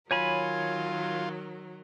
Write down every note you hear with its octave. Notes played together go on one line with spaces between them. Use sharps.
D#3 F#3 F4 A#4 C#5 G#5 B5